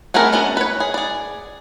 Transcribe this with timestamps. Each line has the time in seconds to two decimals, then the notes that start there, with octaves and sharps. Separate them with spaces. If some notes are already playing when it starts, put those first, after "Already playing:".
0.14 A3 B3 C4 G#4 A#4
0.32 F#3 B3 C#4 D4 F#4
0.57 B4 C#5
0.80 G#4
0.94 G#4 D5